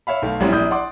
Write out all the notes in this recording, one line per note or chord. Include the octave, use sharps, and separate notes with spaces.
C#5 E5 F5 B5
B1 A3 F5
A#1 F#3 G3 C4 C#4 E4
A#1 E4 D#6 G6
D5 F#5 C6 D6